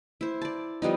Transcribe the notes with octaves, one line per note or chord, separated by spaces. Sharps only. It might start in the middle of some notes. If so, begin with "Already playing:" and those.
E4 C5
D5 A5
F3 G3 B3 D#4